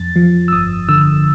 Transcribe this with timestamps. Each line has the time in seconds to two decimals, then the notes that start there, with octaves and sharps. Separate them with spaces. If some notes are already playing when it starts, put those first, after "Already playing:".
Already playing: F2 A6
0.16 F3
0.48 E6
0.53 G1 D#6
0.89 D3 E6